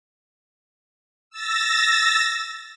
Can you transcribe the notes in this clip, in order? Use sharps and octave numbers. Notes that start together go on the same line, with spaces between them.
E6 A6 A#6